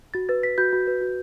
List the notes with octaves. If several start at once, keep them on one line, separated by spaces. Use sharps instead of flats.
F#4 A6
B4 A6
B4 B6
F#4 G6
F#4
B4
F#4